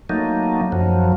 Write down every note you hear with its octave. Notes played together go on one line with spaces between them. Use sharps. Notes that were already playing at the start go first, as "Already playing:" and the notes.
F#3 A3 A#3 D#4
F#2 F3 F#3